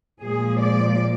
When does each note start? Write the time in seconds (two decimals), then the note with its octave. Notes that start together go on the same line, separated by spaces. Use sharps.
0.21 A#2 F3 G#3 G#4
0.59 D5